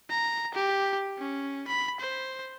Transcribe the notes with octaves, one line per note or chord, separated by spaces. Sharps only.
A#5
G4
C#4
B5
C5